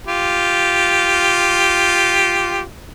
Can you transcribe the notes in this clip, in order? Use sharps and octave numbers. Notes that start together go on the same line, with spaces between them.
F4 G4